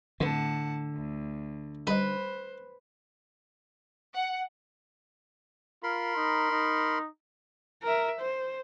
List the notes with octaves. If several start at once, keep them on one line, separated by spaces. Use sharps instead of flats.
F2 A2 D3 B3 F#5 A5
D2
G3 D#4 B4 C5
F#5
F4 A#4 B5 C6
D#4
D#4
A#4 E5
C5